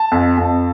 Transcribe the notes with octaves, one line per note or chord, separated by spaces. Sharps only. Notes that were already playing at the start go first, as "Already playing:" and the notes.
Already playing: A5
F2
F2